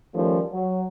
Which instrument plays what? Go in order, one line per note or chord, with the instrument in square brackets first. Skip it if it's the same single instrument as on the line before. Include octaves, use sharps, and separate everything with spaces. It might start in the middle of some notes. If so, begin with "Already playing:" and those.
[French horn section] D#3 F3 G3 A3 C#4
F#3